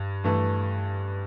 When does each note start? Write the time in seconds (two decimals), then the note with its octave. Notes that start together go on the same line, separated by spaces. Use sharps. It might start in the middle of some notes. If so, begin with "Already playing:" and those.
Already playing: G2
0.24 G2 E3 A3